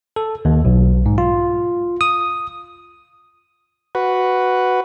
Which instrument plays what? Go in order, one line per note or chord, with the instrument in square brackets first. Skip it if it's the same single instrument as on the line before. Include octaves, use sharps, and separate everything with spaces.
[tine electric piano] A4
D#2
B1
G#2
F4
D#6
[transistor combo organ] F#4 B4